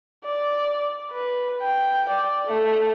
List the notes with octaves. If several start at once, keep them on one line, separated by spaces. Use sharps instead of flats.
D5
B4
G5
D5
A3